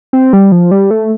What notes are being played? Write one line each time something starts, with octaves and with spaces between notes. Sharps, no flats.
C4
G3
F3
G3
A3